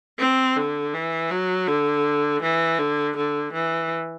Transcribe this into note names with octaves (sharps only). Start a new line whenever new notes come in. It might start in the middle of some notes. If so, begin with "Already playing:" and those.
C4
D3
E3
F#3
D3
E3
D3
D3
E3